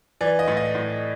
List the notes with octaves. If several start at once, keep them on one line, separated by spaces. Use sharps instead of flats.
E3 D5
D#5
A2
D#5
A2